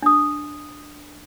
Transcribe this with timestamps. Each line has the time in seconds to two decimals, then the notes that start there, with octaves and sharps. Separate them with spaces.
0.02 D4 D#6